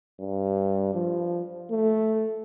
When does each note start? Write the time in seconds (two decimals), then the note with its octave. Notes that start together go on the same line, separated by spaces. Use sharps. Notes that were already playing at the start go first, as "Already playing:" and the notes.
0.20 G2
0.94 F3
1.71 A3